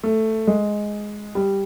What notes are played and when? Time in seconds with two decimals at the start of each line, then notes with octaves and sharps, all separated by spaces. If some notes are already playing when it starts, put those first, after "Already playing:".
0.03 A3
0.47 G#3
1.35 G3